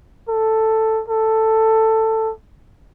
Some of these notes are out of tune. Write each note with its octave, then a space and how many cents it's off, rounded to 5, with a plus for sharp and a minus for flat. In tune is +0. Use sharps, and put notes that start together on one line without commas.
A4 +5
A4 +10